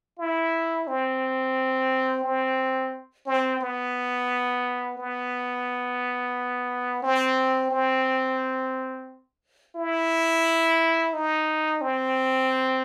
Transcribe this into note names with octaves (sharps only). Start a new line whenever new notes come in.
E4
C4
C4
C4
B3
B3
C4
C4
E4
D#4
C4